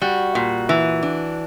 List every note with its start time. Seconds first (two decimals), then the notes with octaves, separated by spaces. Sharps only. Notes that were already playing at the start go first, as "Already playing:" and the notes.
0.02 G3 F#4
0.35 A#2
0.69 E3
1.03 D4